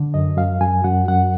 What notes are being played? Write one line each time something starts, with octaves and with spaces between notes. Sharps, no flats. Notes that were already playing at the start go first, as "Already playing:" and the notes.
Already playing: D3
F#2 D#5
F#2 F5
F#2 G#5
F#2 F#5
F#2 F#5